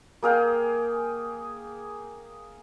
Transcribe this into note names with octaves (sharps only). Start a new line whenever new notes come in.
A#3 G#4 F5 G5